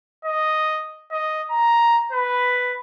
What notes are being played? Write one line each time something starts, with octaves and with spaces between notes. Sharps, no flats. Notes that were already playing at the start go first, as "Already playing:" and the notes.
D#5
D#5
A#5
B4